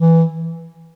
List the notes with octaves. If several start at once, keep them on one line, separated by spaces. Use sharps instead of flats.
E3